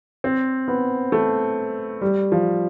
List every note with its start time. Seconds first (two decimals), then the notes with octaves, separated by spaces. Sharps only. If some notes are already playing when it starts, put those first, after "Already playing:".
0.24 C4
0.68 B3
1.12 A3
2.01 G3
2.32 F3